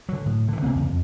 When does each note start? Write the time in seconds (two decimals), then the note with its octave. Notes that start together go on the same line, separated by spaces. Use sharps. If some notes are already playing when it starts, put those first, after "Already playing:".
0.09 D3 F#3
0.26 A2
0.48 D3 E3
0.62 C3 F#3 A#3 C4
0.75 E2 C#3
0.88 F2